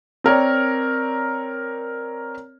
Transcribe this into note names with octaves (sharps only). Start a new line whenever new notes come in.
C4 A#4 C#5 D5